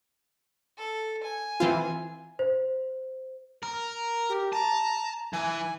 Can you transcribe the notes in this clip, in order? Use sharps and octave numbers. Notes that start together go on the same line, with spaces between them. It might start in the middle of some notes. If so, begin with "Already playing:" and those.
A4
G#5
E3 C4 F4
C5
A#4
G4
A5 A#5
E3 G#5